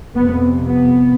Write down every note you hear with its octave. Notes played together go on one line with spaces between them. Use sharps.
F2 C3 B3
B3